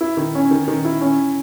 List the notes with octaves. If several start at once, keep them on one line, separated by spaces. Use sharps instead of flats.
E4
D#3
C#4
D#3
D#3
E4
C#4